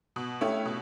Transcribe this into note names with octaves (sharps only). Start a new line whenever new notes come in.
B2
A3 C#4 E4 G4
B2